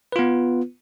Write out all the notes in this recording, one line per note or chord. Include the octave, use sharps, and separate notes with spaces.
B3 F4 B4